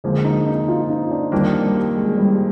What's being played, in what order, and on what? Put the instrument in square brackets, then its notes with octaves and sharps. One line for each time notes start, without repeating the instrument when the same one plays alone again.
[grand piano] F2 D3 F3 A#3 [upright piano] G#3
[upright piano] D#4
D#4
F4
D#4
D4
[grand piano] F2 D#3 A#3 D4 [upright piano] G3
[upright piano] G3
G#3
G3